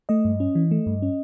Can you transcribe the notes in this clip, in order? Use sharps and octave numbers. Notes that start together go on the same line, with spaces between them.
A3 D#5
G2
C#4
E3
A3
G2
C#4